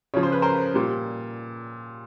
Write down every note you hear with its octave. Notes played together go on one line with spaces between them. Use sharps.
C#3 F3 C#5
C5
B4
A#4 C5
A#2 G3